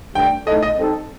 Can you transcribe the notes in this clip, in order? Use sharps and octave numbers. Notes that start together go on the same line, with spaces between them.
G2 D3 A3 D4 G5
A2 A3 D#4 A4 D#5
D#5
G3 C4 D#4 A4